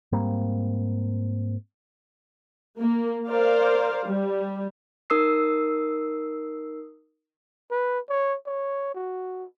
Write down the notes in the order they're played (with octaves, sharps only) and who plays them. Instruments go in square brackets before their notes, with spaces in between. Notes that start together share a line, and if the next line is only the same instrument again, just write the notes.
[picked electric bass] G#2 G3 A#3 C4
[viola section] A#3
A#4 C5 D5 F5
G3
[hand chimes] D#4 A#4 D#6 E6 C7
[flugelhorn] B4
C#5
C#5
F#4